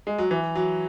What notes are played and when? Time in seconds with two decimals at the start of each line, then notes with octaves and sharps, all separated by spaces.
0.07 G#3
0.18 F#3
0.31 E3
0.55 F#3